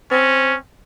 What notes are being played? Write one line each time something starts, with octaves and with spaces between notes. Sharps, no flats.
C4 C#4